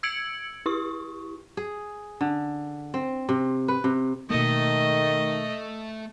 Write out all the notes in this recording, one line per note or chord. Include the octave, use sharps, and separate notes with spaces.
E6 G#6 C#7 D7 F#7
E4 G4 C#6
G#4
D3
C4
C3
B4
C3
B2 D#3 A3 A#3 D#5